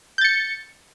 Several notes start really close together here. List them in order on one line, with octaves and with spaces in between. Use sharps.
G6 A6 C#7